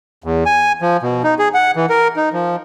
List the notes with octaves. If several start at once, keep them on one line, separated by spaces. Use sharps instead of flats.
E2
G#5
F3
B2
D#4
G#4
F#5
E3
A#4
D#4
F3